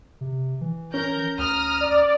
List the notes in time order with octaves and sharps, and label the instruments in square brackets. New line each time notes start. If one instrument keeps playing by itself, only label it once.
[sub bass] C3
E3
[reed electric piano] C#4 [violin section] A#4 G6
[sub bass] D2 [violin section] A#5 D#6 F6
[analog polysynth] D5